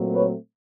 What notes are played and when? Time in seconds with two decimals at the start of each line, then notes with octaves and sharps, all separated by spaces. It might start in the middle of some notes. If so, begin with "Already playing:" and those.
Already playing: A#2 F#3 A3 C4
0.14 B4 C#5